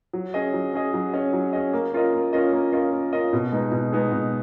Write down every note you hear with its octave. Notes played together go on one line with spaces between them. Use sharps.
F#3
C#4 G#4 D#5
F#3
C#4 G#4 D#5
F#3
C#4 G#4 D#5
F#3
C#4 G#4 D#5
A#3
C#4 F4 A#4 D#5
A#3
C#4 F4 A#4 D#5
A#3
C#4 F4 A#4 D#5
A#3
C#4 F4 A#4 D#5
B2
G#3 B3 D#4 G#4
B2
G#3 B3 D#4 G#4
B2